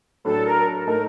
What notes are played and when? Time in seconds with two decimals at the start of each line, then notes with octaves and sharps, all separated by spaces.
0.25 A2 F#3 A3 D4 A4
0.45 A#4
0.87 A2 A3 D#4 A4 A#4